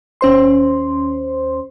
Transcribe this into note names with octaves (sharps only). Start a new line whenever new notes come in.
D#2 C#4 C5 C6